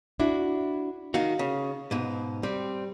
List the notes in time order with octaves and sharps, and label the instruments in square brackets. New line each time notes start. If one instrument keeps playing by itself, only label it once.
[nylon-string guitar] D4 E4 F#4
[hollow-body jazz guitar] D#3 D#4 F#4 [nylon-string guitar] F5
[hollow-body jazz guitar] C#3
G#2 B2
[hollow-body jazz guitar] G3 [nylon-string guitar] C4